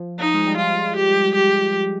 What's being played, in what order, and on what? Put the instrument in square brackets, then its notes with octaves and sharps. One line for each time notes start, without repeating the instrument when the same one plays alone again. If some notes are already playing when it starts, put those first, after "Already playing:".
Already playing: [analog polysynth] F3
[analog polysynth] F3 [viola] D#4
[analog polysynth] G#3
G3
[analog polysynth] F3 [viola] F4
[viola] G4
G4